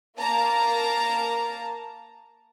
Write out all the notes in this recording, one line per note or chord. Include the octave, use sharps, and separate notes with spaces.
A#3 A5 A#5